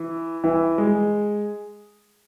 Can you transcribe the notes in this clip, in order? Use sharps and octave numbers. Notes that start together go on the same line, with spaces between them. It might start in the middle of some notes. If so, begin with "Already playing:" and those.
Already playing: E3
E3
G#3